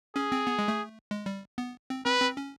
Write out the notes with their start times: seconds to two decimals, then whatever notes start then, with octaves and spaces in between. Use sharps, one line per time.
0.16 C#4 G#4
0.32 C4
0.47 B3
0.59 G#3
0.68 A3
1.11 G#3
1.26 G3
1.58 B3
1.90 C4
2.05 C4 B4
2.22 C4
2.37 C#4